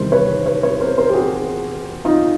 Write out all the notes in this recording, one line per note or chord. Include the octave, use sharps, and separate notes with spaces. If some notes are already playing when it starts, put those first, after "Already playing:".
Already playing: E2 C3 D#3 G3 A#4 C5
B4 C#5
B4 C#5
B4 C#5
A#4 C5
A#4 C5
G4
F#4 G#4
D#4 F4